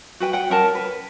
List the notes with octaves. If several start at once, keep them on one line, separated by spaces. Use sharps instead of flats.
F#4 B4 G5
F#5 G5
C#4 A#4 A5
B4